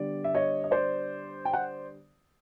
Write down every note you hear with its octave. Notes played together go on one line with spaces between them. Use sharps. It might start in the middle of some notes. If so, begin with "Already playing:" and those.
Already playing: D3 G3 B3 D5
E5
C#5 D#5
D#5
C5 D5
G5
F#5